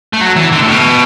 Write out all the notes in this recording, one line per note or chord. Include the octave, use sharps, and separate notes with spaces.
A3
F#3
E3
D3
A2
B2